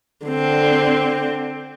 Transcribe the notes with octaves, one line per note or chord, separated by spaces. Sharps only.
D3 C4